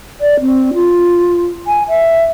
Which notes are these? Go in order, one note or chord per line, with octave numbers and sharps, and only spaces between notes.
D5
C4
F4
G#5
E5